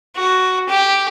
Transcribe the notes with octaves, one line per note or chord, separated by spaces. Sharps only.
F#4
G4